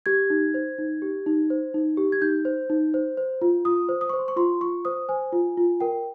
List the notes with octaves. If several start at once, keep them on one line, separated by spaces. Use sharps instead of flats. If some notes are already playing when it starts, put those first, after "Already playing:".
G4 G#6
D#4
C5
D#4
G4
D#4
C5
D#4
G4
G#6
D#4 G6
C5
D#4
C5
C5
F4
F4 D#6
C5
D#6
C#6
C5
C6
C#6
F4 C6
F4 C#6
C5 D#6
C5 G#5
F4
F4
A#4 G5